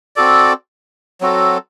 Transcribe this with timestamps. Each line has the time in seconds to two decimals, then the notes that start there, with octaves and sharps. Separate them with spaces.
0.16 C4 F#4 A4 D5
1.21 F#3 C4 F#4 A4